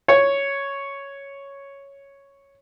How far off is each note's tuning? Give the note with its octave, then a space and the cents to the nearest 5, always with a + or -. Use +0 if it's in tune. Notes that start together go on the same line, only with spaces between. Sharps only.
C#5 +0